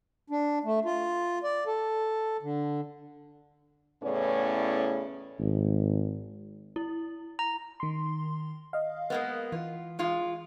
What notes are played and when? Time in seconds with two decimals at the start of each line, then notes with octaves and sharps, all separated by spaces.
0.30 D4
0.64 A3
0.85 F4
1.43 D5
1.67 A4
2.42 D3
4.03 E2 A2 C#3 B3 C#4 D5
5.39 G#1
6.76 E4
7.39 A#5
7.80 D#3 C6
8.73 D#5 F5
9.10 G#3 A#3 B3
9.52 E3 F4
9.99 G#3 F4